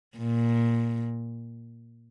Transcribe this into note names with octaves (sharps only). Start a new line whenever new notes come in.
A#2